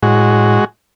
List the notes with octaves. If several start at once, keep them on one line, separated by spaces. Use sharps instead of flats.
A2 G#3 F#4